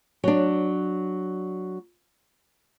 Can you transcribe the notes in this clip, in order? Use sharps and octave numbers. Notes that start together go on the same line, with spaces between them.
F#3 D4